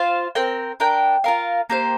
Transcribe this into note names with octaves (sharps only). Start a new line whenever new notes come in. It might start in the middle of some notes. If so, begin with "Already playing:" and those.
Already playing: F4 C5 F5
C4 A#4 G5
D4 A#4 G5
F4 A#4 F5
A#3 G4 C5